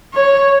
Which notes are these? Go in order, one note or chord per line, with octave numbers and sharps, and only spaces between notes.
C#5